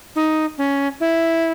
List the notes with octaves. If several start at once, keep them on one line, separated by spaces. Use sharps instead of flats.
D#4
C#4
E4